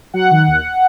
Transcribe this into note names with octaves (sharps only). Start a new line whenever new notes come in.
F#3 F#5
D#3
D#2